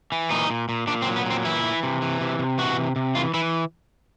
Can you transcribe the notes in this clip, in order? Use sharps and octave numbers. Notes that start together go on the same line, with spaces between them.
E3
A#2 D#4
A#2
A#2
A#2 D4
C4
F#3
B3
A#2 C4
E3 E4
E3
C3
E3
C3
C3
E3 F#4
C3
C3
E3 F4
E3 E4